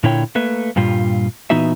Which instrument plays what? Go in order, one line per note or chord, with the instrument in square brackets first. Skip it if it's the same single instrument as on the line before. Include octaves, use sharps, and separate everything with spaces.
[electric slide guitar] A#2 D3 E4 C#5 G5
A3 A#3 B4 E5
G2 A#2 G3 F4
A#2 E3 B3 D#4 F#4 E5